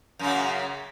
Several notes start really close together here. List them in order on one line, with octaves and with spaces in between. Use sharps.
F#2 C#3 A#3